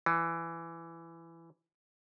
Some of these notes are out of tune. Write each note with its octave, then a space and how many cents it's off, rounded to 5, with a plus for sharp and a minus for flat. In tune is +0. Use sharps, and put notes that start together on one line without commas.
E3 +15